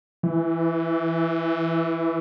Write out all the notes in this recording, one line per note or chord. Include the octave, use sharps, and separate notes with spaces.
E3